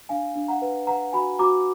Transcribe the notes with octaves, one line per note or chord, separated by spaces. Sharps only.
D4 F5 G#5
D4
F#5 A#5
B4
B4 F#5 A#5
F#4 G#5 B5
F#4 A#5 D6